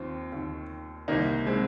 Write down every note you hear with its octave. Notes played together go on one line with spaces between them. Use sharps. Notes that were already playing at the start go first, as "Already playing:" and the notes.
Already playing: D#2 D#3 C4 F4
D#2 D#3
C2 C3 D#3 A#3 D#4
G#3 C4